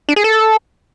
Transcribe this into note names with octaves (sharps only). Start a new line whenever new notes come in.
D4
G#4
A4